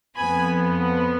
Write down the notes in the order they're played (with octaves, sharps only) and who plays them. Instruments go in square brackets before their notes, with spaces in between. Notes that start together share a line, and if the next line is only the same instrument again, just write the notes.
[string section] F2 F3 B3 G#5 B5